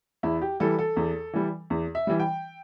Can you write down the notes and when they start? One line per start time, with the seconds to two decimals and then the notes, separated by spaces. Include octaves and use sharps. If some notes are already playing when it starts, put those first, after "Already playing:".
0.23 E2 E4
0.42 G4
0.60 E3 G3 A4
0.79 A4
0.97 E2
1.33 E3 G3
1.70 E2
1.95 E5
2.07 E3 G3
2.20 G5